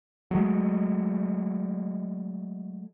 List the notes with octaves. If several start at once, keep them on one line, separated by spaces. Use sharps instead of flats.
F#3 G#3 A3